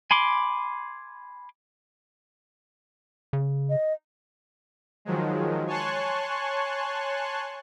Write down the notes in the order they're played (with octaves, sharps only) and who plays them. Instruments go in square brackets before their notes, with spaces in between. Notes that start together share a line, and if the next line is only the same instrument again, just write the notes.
[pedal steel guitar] G#5 B5 C6 D6
[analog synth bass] C#3
[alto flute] D#5
[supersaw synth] D#3 F3 F#3 G#3
C#5 G#5 A5 C6 C#6 F#6